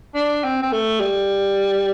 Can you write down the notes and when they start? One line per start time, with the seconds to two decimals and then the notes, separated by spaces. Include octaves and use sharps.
0.15 D4
0.44 C4
0.62 C4
0.72 A3
1.00 G3